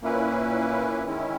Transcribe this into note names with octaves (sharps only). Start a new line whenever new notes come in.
A#2 A#3 C#4 E4 B4
D#3 G#3 C#4 E4